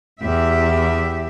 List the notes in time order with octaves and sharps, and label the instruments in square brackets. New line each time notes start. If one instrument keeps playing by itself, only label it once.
[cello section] E2 G4 E5